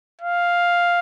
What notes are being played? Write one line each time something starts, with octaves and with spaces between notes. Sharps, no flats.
F5